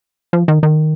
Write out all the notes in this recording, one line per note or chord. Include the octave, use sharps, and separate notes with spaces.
F3
D#3
D#3